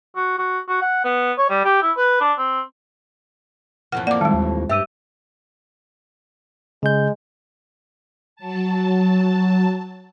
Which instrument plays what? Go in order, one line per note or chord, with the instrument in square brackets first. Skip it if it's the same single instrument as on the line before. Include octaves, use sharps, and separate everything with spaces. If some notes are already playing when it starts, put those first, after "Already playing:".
[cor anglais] F#4
F#4
F#4
F#5
B3
C#5
G3
G4
E4
B4
D4
C4
[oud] F2 A2 E3 [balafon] F#5 [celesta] F6
[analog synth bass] A#3 [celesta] D5 [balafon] F#5 D6
[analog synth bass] D#3 [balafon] G3 G#3 [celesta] A5
[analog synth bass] D#2
[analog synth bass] G2 [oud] G4 [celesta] E5 E6 D#7
[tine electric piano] C#3 G6 [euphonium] G#3
[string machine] F#3 A5